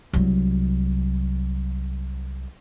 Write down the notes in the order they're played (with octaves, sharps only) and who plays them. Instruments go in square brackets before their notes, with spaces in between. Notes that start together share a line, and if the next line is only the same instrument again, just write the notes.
[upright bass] C2 F#3